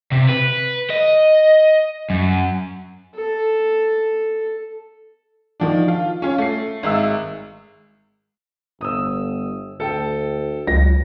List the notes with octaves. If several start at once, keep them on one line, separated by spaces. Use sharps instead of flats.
C3
B4
D#5
F#2
A4
D#3 F3 D4
F4
C#4 F4 C#5
A3 C7
G#1 G#3 E5 E6
G1 D#6 E6
D2 A4 G5
C#2 F#3 A#6